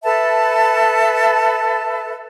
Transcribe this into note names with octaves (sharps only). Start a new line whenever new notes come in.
A4 B4 E5 A5